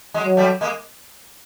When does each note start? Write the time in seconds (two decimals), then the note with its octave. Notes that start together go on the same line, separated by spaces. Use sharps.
0.14 F#3 G#3
0.25 F#3
0.37 G3 A3
0.61 G#3 A#3